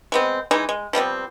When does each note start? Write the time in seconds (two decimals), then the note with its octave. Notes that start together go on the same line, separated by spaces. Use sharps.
0.12 G#3 B3 C4
0.51 E3 G#3 D#4
0.69 G#3
0.93 F3 G3 B3 C4